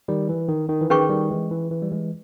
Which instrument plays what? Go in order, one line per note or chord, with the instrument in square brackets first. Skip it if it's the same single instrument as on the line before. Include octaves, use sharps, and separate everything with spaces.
[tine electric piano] D#3 G3
E3
D#3
D#3
E3
[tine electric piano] D#3 [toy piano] C#4 G#4 B4 G5 C#6
[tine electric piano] D#3 G3
E3 G#3
E3
E3
G3
E3 G#3